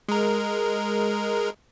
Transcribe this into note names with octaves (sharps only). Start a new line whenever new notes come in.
G#3 A#4